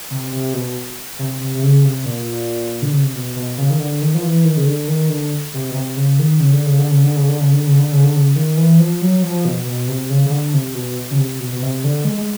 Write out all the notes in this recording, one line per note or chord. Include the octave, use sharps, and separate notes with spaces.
C3
C3
B2
C3
C3
C3
C#3
C3
A#2
D3
C#3
C3
B2
B2
C#3
D#3
D3
D#3
F3
E3
D#3
C#3
D3
D#3
D3
C3
B2
C3
C#3
D#3
C#3
D3
C#3
D3
C#3
D3
C#3
D3
C#3
D3
C#3
D3
C#3
D3
C#3
D#3
E3
F3
F#3
F3
B2
B2
C3
C#3
C#3
D3
C3
B2
C#3
C3
B2
B2
C3
D3
G#3
G#3